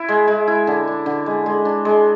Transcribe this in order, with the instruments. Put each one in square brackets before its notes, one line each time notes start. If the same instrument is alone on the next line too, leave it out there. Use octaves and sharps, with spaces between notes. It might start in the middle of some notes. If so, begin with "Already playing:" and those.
Already playing: [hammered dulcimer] E4
G#3
G#3
E4
D3
D4
D3
G#3
G#3
D4
G#3